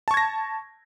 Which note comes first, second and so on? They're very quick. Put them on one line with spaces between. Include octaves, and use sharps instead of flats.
A5 C#6 G#6 A#6